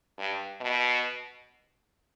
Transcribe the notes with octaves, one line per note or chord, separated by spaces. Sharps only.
G2
B2